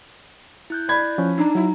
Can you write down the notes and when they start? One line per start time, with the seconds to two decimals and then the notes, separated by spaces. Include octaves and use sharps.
0.70 E4 F#6 G6
0.89 D5 B5 G#6
1.18 F3 C#4
1.38 D4 D#4 A#5
1.55 F#3 E4